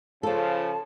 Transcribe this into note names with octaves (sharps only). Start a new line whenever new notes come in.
C#3 F3 F4 A4 A5